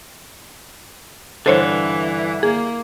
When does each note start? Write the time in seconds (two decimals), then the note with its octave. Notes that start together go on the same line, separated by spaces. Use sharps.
1.46 G2 D3 E3 A4 C5 C#5
2.43 A#3 G#4